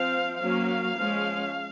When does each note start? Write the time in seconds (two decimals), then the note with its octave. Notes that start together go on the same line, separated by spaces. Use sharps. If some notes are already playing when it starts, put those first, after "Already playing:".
Already playing: F3 C4 F5
0.40 F#3 A#3 C#4 F5
0.96 F3 G#3 C#4